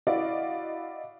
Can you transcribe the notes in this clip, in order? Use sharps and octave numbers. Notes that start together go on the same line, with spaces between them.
E4 F#4 D5 D#5 F5